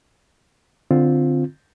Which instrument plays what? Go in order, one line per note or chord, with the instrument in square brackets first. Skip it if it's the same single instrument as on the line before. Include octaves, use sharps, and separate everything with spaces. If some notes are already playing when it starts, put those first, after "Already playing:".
[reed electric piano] D3 C4 F4